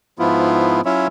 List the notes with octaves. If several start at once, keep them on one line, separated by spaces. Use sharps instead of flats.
G#2 F3 B3 E4 F4
F#3 C#4 E4 F4 C#5 E5